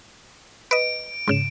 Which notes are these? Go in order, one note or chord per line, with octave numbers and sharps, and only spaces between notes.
B4 D#5 D7
G#2 C#3 E7